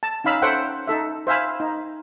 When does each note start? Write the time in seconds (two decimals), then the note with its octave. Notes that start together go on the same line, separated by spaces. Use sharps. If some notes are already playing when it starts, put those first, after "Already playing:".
0.03 A5
0.24 C#4 D#4 F5 B5 E6
0.42 A4 C5 C#5 E5 F#5 G5
0.87 D#4 A4 E5
1.27 C5 E5 F5 G#5 B5
1.60 D#4